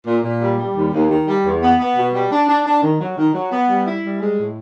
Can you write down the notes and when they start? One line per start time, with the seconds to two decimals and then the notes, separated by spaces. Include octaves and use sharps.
0.07 A#2
0.24 A#2
0.41 G3
0.59 G3
0.76 D#2
0.93 D#2
1.11 D#3
1.28 G3
1.45 E2
1.63 B3
1.79 B3
1.96 B2
2.14 G3
2.31 D4
2.48 D4
2.65 D4
2.82 D#3
3.00 F#3
3.17 D#3
3.34 F#3
3.52 B3
3.68 G3
3.86 E4
4.03 G3
4.20 G#3
4.38 A2